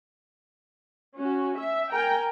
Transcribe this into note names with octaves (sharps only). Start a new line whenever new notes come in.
C#4 F#4
E5
A#4 G5 G#5 A#5